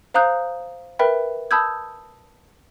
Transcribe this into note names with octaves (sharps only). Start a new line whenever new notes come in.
C5 F5 A#5 D#6 F#6 G6
A#4 B4 E5 G5 B5
A5 B5 D#6 E6 G6 G#6